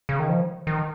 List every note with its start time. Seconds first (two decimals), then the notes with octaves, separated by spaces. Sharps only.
0.09 C#3
0.19 D#3
0.29 F3
0.67 D#3